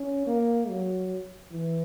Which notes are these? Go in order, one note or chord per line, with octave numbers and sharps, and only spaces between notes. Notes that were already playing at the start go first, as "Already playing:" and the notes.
Already playing: C#4
A#3
F#3
E3